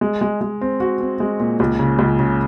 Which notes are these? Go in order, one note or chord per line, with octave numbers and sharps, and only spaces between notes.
G#3
G#3
G#3
C4
F#4
C4
G#3
A#2
C#2
C#3
C#2
C#3